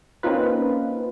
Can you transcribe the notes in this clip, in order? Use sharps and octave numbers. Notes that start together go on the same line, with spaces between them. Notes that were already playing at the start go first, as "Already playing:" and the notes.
A#3 C4 C#4 D#4 F4 B4